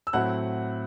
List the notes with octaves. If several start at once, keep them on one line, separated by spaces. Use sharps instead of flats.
E6
A2 F#3 C4 E4 F#5 F#6